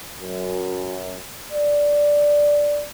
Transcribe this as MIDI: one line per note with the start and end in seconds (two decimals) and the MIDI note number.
0.20 1.17 42
1.52 2.83 74